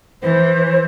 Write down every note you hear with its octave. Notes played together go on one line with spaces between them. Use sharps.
E3 C5